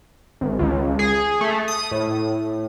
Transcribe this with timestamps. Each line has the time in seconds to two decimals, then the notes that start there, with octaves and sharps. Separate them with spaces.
0.41 G#1
0.59 C#2
0.99 G#4
1.41 A3
1.68 D#6
1.91 A2